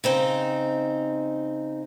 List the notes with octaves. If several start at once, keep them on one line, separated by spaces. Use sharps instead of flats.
C#3 C4 D#4